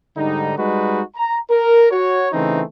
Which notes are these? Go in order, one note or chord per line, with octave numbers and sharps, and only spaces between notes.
G#2 D3 G3 D#4
G3 G#3 D#4 F#4 B4
A#5
A#4
F#4 C#5
C#3 E3 A3 C4 D#4